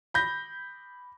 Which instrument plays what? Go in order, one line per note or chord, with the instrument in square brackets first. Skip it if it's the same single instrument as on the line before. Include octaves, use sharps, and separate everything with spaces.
[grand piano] B5 G6 A#6